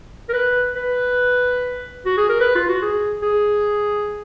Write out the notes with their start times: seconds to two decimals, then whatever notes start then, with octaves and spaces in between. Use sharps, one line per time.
0.29 A#4
0.34 B4
0.75 B4
2.05 F#4
2.17 G#4
2.29 A#4
2.40 B4
2.55 F4
2.69 F#4
2.82 G#4
3.23 G#4